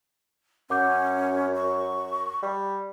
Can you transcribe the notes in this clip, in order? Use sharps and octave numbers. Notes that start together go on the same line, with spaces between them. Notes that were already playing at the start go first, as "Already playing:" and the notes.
F#2 C#4 F#5 D6 G6
C#6
G3